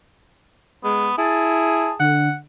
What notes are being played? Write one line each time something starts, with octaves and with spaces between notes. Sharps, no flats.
G#3 B3
E4 G#4 A5
D3 F#5